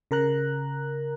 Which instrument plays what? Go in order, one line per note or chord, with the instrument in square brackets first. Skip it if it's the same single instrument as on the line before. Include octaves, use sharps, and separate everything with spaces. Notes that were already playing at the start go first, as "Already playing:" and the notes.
[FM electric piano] C#3 A#4 A#5 F#6